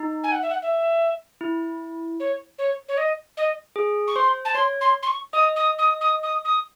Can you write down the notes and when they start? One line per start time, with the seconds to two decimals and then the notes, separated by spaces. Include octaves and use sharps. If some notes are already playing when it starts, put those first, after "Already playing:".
Already playing: D#4
0.24 G#5
0.32 F#5
0.42 E5
0.50 F#5
0.62 E5
1.41 E4
2.20 C#5
2.58 C#5
2.88 C#5
2.97 D#5
3.37 D#5
3.76 G#4
4.07 C#6
4.16 C5 C6
4.45 A5
4.54 C#5 C6
4.81 C6
5.03 C6
5.07 C#6
5.33 D#5 D#6
5.56 D#6
5.78 D#6
6.01 D#6
6.23 D#6
6.45 D#6